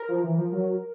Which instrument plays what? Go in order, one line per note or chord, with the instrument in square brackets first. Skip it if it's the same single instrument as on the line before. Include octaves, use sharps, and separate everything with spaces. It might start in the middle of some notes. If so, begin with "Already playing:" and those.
Already playing: [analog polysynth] A#4
[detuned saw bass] F3
E3
F3
F#3